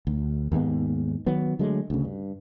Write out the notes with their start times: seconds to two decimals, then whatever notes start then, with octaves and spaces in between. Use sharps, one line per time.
0.07 D2
0.52 D#2 G#2 G#3 B3
1.26 D#3 F#3 B3
1.59 D3 F#3 G#3 A3
1.90 D2 C#3
2.05 G2